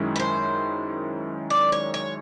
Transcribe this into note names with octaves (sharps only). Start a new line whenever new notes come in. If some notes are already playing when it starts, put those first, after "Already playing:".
Already playing: F#2 D#3 G#3 C#4 E4
B4
C5
D5
C#5
C#5